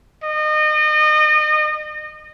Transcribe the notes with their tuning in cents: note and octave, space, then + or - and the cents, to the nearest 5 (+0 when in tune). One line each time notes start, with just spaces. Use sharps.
D#5 -30